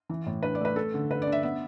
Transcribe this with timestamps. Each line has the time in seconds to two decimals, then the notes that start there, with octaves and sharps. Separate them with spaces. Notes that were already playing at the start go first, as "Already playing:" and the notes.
0.10 E3
0.26 A2
0.43 D4 B4
0.55 D5
0.60 A3 B4
0.76 A3 A4
0.94 D3
1.11 D3 B4
1.22 D5
1.27 D4
1.32 E5
1.43 B3 E5